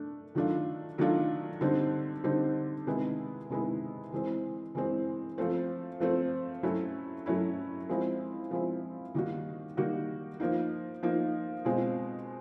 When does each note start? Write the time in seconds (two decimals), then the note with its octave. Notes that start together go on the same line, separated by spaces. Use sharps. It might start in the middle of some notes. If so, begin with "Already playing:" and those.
Already playing: A3 D4
0.35 D#3 F#3 A3 D4 F4
0.98 D#3 F#3 A3 D4 F4
1.61 D3 G3 C4 D#4
2.24 D3 G3 C4 D#4
2.86 C3 D#3 G#3 B3 E4
3.50 C3 D#3 G#3 B3 E4
4.12 E3 G#3 C4
4.75 E3 G#3 C4
5.38 F3 A3 C4
6.00 F3 A3 C4
6.63 F#3 A3 C#4 E4
7.26 F#3 A3 C#4 E4
7.89 F3 G#3 C4 E4
8.51 F3 G#3 C4 E4
9.14 D#3 G3 A#3 D#4 F#4
9.77 D#3 G3 A#3 D#4 F#4
10.40 F3 A#3 D#4
11.03 F3 A#3 D#4
11.65 B2 G#3 C4 F4